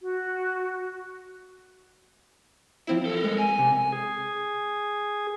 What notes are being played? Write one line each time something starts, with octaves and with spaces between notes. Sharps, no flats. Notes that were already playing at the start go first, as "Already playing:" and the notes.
F#4
F3 C4 E4
A4 A#4
G#3
G#5
C3
G#4